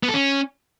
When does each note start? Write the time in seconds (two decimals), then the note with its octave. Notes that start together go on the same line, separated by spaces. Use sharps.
0.03 B3
0.09 A4
0.14 C#4